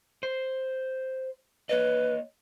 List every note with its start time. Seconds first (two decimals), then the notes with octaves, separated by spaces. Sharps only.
0.23 C5
1.69 A#3 B4 C#5 D#5